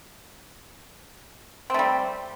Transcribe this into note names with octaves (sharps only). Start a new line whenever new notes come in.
G3 A3 C4